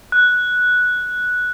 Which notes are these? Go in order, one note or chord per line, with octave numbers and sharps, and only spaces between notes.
F#6